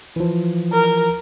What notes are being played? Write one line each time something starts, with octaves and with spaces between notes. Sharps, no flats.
E3 F3
A#4